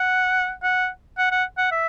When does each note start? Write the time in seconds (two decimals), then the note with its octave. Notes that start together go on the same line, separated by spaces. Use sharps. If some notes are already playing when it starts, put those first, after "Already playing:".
Already playing: F#5
0.63 F#5
1.18 F#5
1.31 F#5
1.58 F#5
1.71 E5